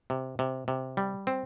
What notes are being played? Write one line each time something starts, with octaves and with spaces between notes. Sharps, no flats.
C3
C3
C3
G3
C4